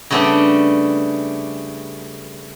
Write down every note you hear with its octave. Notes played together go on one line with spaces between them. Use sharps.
C#3 G3 A3 B3 C#4 D4